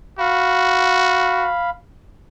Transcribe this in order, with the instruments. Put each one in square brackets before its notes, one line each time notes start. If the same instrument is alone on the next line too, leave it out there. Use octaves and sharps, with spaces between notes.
[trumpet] F#4 [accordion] F5 B5